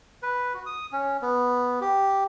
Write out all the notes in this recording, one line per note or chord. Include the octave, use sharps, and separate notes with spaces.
B4
F#4
D#6
C#4
B3
G4